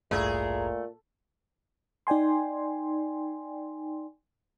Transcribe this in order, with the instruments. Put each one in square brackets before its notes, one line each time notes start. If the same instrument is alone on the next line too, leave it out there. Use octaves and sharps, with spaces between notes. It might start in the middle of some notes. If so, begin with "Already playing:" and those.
[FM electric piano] A1 D2 G2 [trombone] A#2 [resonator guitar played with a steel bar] A3 [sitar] E4 G#4 A#4
[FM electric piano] D#4 D5 G5 G#5 C6